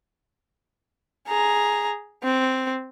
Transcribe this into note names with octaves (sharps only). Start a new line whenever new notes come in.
G#4 A#5
C4